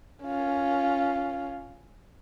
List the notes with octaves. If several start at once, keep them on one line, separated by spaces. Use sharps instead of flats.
C#4 F4